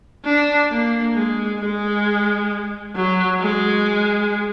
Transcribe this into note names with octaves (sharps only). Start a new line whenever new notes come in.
D4
A#3
G#3
G#3
F#3
G#3